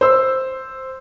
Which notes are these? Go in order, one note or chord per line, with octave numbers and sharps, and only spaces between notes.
C5 E6